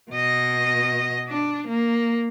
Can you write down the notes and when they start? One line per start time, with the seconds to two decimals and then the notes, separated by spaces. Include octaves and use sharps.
0.11 B2 D#5
1.28 D4
1.68 A#3